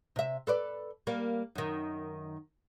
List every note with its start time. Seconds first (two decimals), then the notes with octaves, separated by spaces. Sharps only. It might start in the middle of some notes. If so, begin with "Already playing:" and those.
0.16 C3 E5
0.47 A4 B4 D5
1.07 G3 A#3
1.55 F#2 D#3